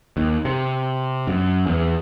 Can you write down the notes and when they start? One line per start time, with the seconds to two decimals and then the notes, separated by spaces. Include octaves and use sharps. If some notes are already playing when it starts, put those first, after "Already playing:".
0.17 D#2
0.45 C3
1.27 F#2
1.67 E2